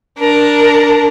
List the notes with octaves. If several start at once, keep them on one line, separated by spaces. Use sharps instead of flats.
D4 A#4